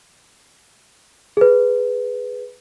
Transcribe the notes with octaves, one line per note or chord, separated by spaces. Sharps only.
G#4 B4